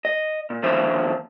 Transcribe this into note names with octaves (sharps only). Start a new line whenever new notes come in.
D#5
A#2
D#2 D3 F3 C5 E5